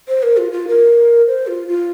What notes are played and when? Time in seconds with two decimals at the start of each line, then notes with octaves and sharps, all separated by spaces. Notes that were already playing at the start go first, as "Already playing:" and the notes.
0.08 C5
0.23 A#4
0.37 F4
0.52 F4
0.68 A#4
1.27 C5
1.47 F4
1.68 F4